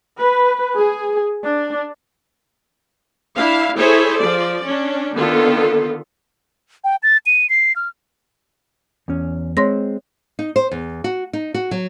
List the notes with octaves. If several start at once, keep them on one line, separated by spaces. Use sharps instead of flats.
B4
G#4
D4
D4 E4 F5
E4 G#4 A4 C5 C#5
F3 D5
C#4 D4
D3 D#3 B3 F4 A4
G5
A6
D#7
C7
F6
E2 C#4
G#3 C4 C#5 C6 A#6
D#4
C5
E2
F#4
D#4
F#4
F#3